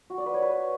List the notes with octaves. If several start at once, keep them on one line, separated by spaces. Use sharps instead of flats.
F#4
D5
B4
C#5
B4